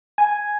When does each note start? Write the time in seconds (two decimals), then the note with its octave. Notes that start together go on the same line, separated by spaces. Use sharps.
0.18 G#5